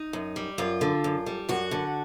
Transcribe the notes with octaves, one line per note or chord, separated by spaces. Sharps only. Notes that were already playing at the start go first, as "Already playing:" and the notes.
Already playing: D#4
F#2
G3
F#2 F4
D3
F#2
G3
F#2 F#4
D3